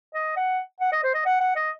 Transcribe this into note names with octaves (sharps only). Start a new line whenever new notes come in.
D#5
F#5
F#5
D#5
C5
D#5
F#5
F#5
D#5